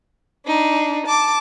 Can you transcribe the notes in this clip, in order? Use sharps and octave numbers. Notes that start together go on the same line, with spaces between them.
D4 D#4
A5 D6